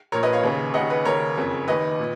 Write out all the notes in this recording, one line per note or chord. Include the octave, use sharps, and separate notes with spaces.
A#1 A#2 A#4 C#5
B4 D#5
C#5 F5
D#2 C#3
D#2 C#3 D#5 F#5
B4
D#2 C#3 A#4 C#5
F#1 F2 C#3
D#2 D#3 B4 D#5
A#2